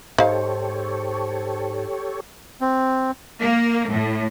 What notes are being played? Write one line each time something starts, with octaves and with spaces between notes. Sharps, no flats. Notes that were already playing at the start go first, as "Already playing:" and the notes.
G#2 D#4 G4 A4 C5 C#5 F5
C4
A#3
A2